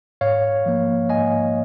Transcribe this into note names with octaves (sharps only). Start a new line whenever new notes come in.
G#2 C#5 F5
F3 A#3
G#2 D#5 G#5